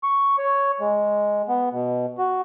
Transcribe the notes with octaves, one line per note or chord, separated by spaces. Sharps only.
C#6
C#5
G#3
B3
B2
F#4